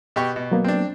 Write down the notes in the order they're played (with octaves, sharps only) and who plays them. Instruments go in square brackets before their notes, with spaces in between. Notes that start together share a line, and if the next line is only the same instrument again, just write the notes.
[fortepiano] B2 G4 C#6
B2
[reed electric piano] F#3 A#3 B3
[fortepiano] C4 D4